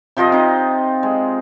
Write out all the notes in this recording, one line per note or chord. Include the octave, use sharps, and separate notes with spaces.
C3 F3 F4 D#5
C3 D#4
G#3